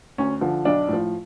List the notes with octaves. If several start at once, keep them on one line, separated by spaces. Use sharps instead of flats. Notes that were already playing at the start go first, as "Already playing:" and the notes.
D2 C#4
D3 F3
B1 D4
A2 F3